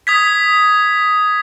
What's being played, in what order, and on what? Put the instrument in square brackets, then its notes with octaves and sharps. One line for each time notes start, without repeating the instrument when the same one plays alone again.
[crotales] D#6 G#6 B6